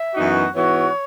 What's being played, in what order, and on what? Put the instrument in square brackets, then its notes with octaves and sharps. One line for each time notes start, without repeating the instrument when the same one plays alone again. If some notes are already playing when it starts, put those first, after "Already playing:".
Already playing: [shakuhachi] E5
[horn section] F#2 E3 B3 D#4 F#4
[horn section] G#2 E3 B3 F#4 [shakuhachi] C#5